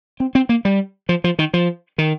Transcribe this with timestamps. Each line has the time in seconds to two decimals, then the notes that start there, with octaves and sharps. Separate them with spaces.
0.20 C4
0.35 C4
0.49 A#3
0.65 G3
1.09 F3
1.24 F3
1.39 D#3
1.54 F3
1.98 D#3